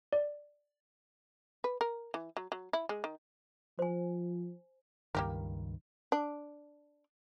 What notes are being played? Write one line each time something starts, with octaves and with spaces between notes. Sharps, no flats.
D5
B4
A#4
E3
F#3
F#3
E4
G#3
D#3
F3 C5 G#5
C#2 G2 D#3 A#3 G4 A#4
D4